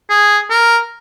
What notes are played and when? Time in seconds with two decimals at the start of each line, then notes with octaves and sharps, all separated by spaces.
0.09 G#4
0.50 A#4